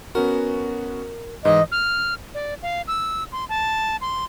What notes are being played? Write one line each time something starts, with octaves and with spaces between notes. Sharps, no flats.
B3 C#4 F#4 A#4
G#2 E3 D#5
F6
D5
F5
E6
C6
A5
C6